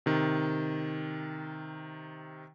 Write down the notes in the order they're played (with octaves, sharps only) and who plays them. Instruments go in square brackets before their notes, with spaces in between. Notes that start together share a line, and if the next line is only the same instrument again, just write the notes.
[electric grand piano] C3 D#3